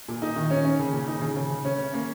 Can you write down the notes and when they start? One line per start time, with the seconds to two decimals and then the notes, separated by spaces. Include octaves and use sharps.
0.08 A#2
0.22 D#4
0.36 D#3
0.51 C#4
0.65 C#4
0.79 C#3
0.93 A#2
1.08 D#4
1.22 C#3
1.36 C#3
1.50 C#3
1.65 C#4
1.79 C#4
1.94 A#3